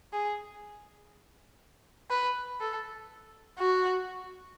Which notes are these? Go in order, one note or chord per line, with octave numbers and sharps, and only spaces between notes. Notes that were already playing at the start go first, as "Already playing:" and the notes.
G#4
B4
A4
F#4